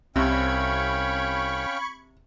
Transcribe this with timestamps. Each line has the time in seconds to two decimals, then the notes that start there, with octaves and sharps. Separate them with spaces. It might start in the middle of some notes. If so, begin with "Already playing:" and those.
0.16 C2 C3 C#4 F5 G5 B5 C#6 G#6